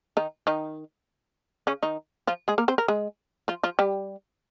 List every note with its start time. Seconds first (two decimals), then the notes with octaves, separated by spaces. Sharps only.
0.17 D#3 D#4
0.47 D#3 D#4
1.67 C#3 C#4
1.83 D#3 D#4
2.27 F3 F4
2.48 G#3 G#4
2.58 A#3 A#4
2.68 C4 C5
2.78 A#4
2.88 G#3 G#4
3.48 F3 F4
3.63 F3 F4
3.79 G3 G4